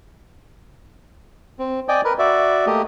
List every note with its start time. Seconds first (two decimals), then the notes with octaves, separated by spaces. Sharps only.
1.59 C4
1.88 D5 D#5 G5 G#5
2.05 A#4 B4
2.19 F#4 D5 E5
2.66 A3 A#3 G4 D#5